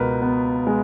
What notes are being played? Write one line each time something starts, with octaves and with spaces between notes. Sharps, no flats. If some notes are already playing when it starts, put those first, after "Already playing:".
Already playing: C#2 B2 A#4 B4
B3
G#3